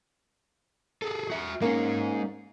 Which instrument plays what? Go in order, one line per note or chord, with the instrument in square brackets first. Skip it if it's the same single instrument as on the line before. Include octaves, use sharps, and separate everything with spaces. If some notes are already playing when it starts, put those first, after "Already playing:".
[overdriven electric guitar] G#4 A4
F#4 E5
[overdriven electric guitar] G#3 D#4 [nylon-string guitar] A#3 C#4